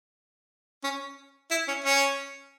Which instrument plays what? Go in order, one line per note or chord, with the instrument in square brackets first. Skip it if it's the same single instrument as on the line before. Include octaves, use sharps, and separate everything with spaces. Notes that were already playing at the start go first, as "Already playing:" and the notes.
[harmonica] C#4
E4
C#4
C#4